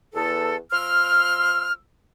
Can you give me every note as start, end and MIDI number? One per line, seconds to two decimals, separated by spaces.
0.13 0.56 40
0.13 0.56 69
0.72 1.72 53
0.72 1.72 84
0.72 1.72 88
0.72 1.72 89